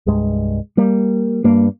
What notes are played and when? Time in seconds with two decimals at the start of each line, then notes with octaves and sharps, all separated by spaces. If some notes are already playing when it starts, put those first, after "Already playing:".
0.06 C2 G2 G#3
0.77 G3 A#3
1.44 G2 A#3